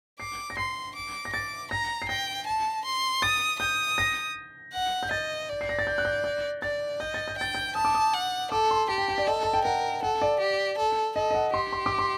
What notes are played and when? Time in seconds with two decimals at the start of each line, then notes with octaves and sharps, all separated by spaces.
0.20 D6 C7
0.50 A#6
0.57 C6 C7
0.95 D6
1.25 A#6
1.33 D6 A6
1.71 A#5 A#6
2.02 C7
2.09 G5 A#6
2.47 A5
2.85 C6
3.22 D#6 A6
3.59 D#6 G6
3.98 A#6
4.73 F#5
5.03 G6
5.11 D#5 A6
5.49 D5
5.61 C7
5.69 A#6
5.79 A6
5.87 G6
5.98 F#6
6.05 G6
6.24 G6
6.62 D5 A6
7.00 D#5 G6
7.14 A6
7.28 G6
7.38 G5 A6
7.55 G6
7.75 A5 D#6
7.85 D6
7.95 D#6
8.14 F#5
8.51 A4 D6
8.71 C6
8.89 G4 A5
8.98 G5
9.08 G5
9.18 D5
9.27 A4 D#5
9.43 A5
9.54 G5
9.65 A#4 F#5
10.03 A4 F#5
10.22 D5
10.40 G4
10.78 A4
11.16 A4 D#5
11.31 D#5
11.34 F#5
11.54 G4 C6
11.73 C6
11.86 D6
11.99 C6